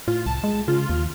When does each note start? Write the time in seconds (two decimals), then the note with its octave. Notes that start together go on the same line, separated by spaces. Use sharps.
0.08 A2 F4
0.26 C2 A5
0.44 G#3
0.68 C#3 F4
0.89 D#2